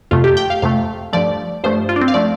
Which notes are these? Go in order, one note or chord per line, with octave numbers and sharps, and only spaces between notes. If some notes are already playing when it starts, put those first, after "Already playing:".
F2 C3 A3 F4
G4
G5
F5
F2 C3 A3 F5
G2 F3 A3 D5
G2 F3 A3 C5
F4
D4
C4
F5
F3 A3 D5